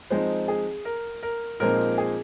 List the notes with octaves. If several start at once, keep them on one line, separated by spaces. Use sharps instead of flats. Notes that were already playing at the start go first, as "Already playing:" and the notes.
F3 G#3 C4 D#4 C5
G#4
A#4
A#4
A#2 F3 G#3 C4 D#4 A#4
G#4